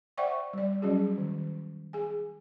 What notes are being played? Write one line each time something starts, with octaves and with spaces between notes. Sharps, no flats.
C5 D5 E5 F#5 G5 C#6
G3 D5
F#3 G3 C#4 F#4 G#4
D#3
G#4 G#5